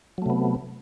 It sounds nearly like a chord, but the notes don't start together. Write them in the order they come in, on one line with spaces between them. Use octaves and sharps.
F#3 A3 C3 B3